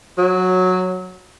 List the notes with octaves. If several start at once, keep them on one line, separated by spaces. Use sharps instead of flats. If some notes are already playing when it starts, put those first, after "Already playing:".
F#3